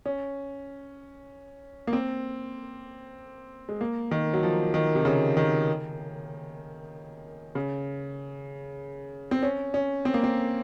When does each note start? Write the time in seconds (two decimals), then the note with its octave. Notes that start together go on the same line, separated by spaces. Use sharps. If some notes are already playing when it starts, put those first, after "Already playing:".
0.06 C#4
1.87 A#3
1.93 C4
3.69 G#3
3.81 A#3
4.11 D#3
4.33 F#3
4.43 F3
4.74 D#3
4.95 C3
5.05 C#3
5.37 D#3
7.55 C#3
9.31 C4
9.42 C#4
9.74 C#4
10.05 C4
10.14 A#3
10.24 C4